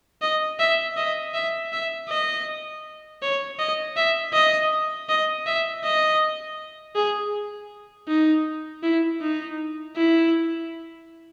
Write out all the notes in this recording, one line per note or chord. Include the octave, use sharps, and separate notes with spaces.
D#5
E5
D#5
E5
E5
D#5
C#5
D#5
E5
D#5
D#5
E5
D#5
G#4
D#4
E4
D#4
E4